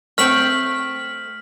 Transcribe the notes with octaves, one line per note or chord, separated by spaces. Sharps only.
A3 C4 F6 B6 F#7